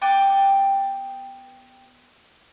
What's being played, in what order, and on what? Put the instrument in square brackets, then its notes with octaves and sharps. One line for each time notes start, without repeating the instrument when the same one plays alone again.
[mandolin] B3 G5 A5 D6